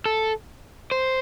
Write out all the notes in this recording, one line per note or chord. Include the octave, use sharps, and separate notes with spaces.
A4
C5